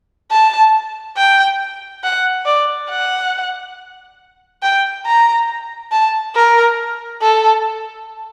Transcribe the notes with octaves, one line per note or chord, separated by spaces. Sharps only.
A5
G5
F#5
D5
F#5
G5
A#5
A5
A#4
A4